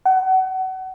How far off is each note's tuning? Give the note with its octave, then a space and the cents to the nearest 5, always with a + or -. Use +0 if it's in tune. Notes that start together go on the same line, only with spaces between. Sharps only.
F#5 +30